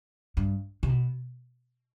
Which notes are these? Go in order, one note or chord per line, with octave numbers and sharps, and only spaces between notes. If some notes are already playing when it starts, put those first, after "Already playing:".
G2
C3
B2